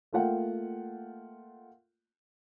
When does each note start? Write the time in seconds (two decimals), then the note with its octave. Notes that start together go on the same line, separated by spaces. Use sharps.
0.13 A3 A#3 F4 F#5 G5